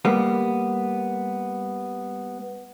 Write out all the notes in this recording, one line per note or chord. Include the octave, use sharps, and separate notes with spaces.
G3 A#3 B3